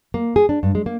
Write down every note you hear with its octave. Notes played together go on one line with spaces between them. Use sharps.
A#3
G#4
D4
G2
G#3
A#3